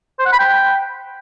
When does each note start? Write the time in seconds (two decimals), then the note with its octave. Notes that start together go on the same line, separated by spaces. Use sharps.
0.19 C5
0.26 F#5
0.32 B5
0.39 G5